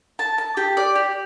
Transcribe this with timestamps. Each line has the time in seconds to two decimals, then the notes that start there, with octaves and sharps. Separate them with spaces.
0.19 A5
0.38 A5
0.57 G4
0.77 D5
0.95 G4